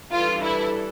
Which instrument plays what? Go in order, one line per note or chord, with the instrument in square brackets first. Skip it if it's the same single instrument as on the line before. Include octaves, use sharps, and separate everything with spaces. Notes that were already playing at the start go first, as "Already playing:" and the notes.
[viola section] E3 G3 D4 A4 [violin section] F4
[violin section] E4